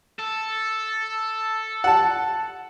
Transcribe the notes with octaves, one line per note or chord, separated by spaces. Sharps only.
A4
F#5 A5